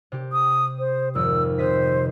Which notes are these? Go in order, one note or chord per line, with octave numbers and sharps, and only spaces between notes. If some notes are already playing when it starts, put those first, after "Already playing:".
C3 G4
D#6
C5
G#1 F2 E6
C3 C5 D#5 B6